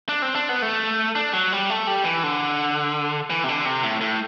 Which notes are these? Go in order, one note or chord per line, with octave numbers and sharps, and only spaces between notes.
D4
C4
D4
B3
A3
D4
F#3
G3
A3
G3
E3
D3
E3
C3
D3
C3
A2
A2